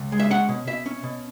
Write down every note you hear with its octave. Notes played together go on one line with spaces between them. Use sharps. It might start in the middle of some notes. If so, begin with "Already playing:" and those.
Already playing: C#2
G#3
E5
C#4 F#5
B2
B2 E5
C#4
B2